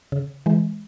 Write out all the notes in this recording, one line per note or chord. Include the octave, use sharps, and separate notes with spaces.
C#3
E3 G#3